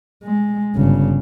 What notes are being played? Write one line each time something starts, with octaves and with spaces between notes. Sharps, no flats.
G#3
G1 C#3